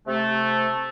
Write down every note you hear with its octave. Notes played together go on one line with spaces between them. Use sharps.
C3 A3